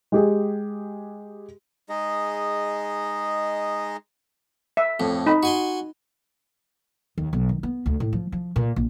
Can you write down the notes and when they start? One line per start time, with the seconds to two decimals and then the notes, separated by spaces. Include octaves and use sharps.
0.12 G#3 G4 G#4
1.89 G#3 D#4 G#4 D#5
4.77 E5
5.00 F2 A2
5.27 D#4 B5
5.43 F#4 G#5 C6
7.18 D#2
7.33 B1
7.49 D#3
7.63 B3
7.86 D2
8.00 A2
8.13 F3
8.32 F3
8.56 A#2
8.76 A#1